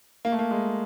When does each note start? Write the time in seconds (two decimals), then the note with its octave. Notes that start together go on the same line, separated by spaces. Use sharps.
0.25 A#3
0.32 A3
0.39 A#3
0.51 G#3